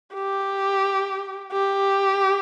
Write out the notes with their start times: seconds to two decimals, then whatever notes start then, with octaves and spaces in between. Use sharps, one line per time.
0.14 G4
1.52 G4